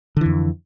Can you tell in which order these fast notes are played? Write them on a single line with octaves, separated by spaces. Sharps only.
D3 E3 F2